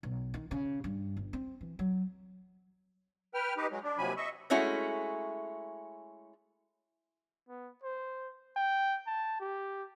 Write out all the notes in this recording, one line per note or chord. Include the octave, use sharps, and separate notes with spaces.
B1
D#3
C#3
G2
G1
C4
E3
F#3
B4 G5 F6
D#4 G4 B4
F#3 G#3
D4
D#2 C3 F3 F#3 G#5 B5
D#5 E5 C#6
G#3 A3 C#4 E4 F#4
B3
C5
G5
A5
G4